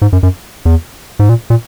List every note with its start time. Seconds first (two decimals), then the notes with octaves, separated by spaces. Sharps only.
0.02 G#2
0.13 F#2
0.23 F#2
0.65 E2
1.19 G#2
1.29 A#2
1.50 A#2